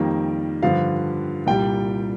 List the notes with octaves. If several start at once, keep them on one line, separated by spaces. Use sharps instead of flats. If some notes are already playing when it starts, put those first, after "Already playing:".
Already playing: F2 D#3 G3 A#3
G2 D3 F3 F5
C2 A#2 G3 G5